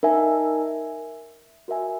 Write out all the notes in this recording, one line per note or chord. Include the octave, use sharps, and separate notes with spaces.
D#4 A#4 E5 G#5
F#4 A#4 E5 G#5